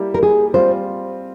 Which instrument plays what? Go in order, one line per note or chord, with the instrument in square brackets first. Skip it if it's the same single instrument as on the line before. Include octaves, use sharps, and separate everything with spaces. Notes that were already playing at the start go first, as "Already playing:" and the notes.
Already playing: [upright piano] G3 A#3 E4 G4
[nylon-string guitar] A#4
G#4
[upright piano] G3 C4 F4 [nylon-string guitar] C5